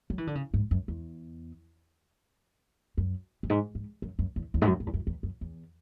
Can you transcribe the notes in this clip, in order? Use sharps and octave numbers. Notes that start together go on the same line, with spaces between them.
F#3
E3
D3
C#3
G#2
F#2
E2
F#2
F#2
G#2
G#2
F#2
F#2
E2
E2
G#2
F#2
G#2
E2
F#2
E2
F#2
E2